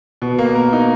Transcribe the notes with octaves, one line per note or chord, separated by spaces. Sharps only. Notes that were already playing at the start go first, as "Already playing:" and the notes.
B2
A#3
A#4
D#4